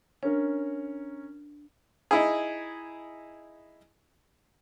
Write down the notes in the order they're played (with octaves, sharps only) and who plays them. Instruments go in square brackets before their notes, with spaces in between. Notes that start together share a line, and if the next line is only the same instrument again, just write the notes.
[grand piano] C#4 A#4 C#5 [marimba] D4
[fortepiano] D#4 E4 G#4